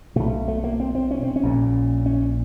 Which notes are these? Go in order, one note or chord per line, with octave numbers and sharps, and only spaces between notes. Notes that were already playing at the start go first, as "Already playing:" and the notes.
B1 B2 A3
A3
A#3
C4
C4
C#4
C4
C#4
A#1 A#2
C#4